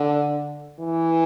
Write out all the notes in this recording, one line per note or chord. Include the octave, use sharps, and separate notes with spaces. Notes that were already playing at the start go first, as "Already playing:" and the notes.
Already playing: D3
E3